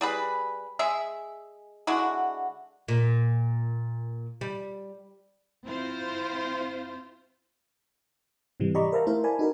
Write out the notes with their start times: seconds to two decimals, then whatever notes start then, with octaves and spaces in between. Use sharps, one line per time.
0.01 G3 G#4 B4
0.79 G#3 G#4 E5
1.87 D3 G#3 E4 F#4
2.88 A#2
4.41 G3
5.65 C4 E4 F4 C5
8.60 G#2 C3 E3 G3
8.75 G4 D5 D#5 A#5 B5 C#6
8.92 A#4 C5 E5 F5 A5 A#5
9.07 A3 E4 A#4 C5 F5
9.24 A#4 D5 G#5 A5 B5
9.39 D#4 F#4 A4 A#4